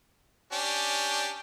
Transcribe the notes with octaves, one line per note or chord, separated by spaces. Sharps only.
C#4 D4 G4